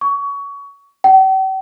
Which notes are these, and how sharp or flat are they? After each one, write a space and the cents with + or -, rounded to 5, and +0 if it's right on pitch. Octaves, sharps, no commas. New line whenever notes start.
C#6 +25
G5 -45